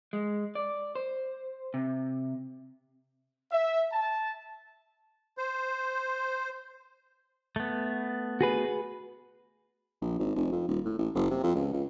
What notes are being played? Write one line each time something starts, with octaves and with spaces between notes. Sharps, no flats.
G#3
D5
C5
C3
E5
A5
C5
A3 B3
F#4 G#4 B4
A#1
G#1
F1
F2
D#1
A2
A1
F#1
C3
F2
C#2
C#2